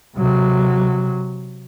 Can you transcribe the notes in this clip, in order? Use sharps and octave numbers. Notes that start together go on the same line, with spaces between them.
C3 F#3